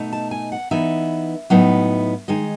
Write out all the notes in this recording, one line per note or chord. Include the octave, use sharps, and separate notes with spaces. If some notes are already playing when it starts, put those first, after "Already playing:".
Already playing: B2 A3 D#4
A5
G#5
F#5
E3 B3 D#4 E5
A2 F#3 B3 D#4
D#3 G#3 D#4 D#5